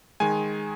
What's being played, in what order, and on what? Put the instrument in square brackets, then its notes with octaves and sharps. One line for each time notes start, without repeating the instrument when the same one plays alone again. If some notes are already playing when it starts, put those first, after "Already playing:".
[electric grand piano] D#3 G#3 G#5